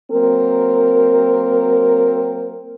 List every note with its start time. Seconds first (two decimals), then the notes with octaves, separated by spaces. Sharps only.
0.11 F#3 A#3 C4 A#4